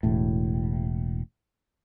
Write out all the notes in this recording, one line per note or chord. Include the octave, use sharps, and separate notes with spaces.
E1 A2